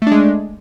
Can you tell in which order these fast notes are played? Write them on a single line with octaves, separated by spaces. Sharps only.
A3 D4 G#3